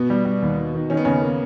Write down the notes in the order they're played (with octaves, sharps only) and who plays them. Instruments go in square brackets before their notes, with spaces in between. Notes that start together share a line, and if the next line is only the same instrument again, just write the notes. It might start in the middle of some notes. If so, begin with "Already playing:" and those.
Already playing: [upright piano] B2 B3
[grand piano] G3
G3
D#2
D#3
D#3
[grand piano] D#3 [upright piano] C#4
[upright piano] B3
[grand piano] D#2 [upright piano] C#3 C#4
[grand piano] A#3